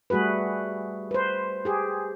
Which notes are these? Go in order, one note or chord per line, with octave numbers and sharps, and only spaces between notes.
G3 A3 F#4 G#4 B4
B4 C5
G4 G#4